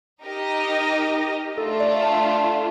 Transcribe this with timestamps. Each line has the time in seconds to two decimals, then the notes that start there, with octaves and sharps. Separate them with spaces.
0.23 D#4 G4 A#4 D#5
1.58 A3 D4 F4 A4
1.80 D5
2.03 A5